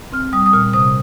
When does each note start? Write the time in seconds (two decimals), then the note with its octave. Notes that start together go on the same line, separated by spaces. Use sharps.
0.12 C4 F6
0.33 G3 D#6
0.46 D#6
0.53 A#2 F6
0.73 C3 D#6